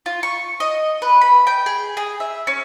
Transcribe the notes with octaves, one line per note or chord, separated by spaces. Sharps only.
F4
C#6
D#5
B4
B5
G5
G#4
G#4
E5
C#4